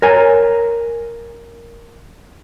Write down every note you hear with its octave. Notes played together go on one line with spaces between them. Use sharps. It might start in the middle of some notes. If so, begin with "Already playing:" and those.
A#4 C#5 G#5